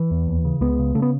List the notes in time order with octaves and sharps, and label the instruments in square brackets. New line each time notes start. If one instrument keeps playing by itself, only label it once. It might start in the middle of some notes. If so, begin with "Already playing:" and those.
Already playing: [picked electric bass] E3
E2
D#2
C#3
C#2 G#3 B3
C#3
C#3 A3
B3